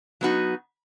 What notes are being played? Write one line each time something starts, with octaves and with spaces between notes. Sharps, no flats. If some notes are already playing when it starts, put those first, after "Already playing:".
F#3 B3 D#4 F#4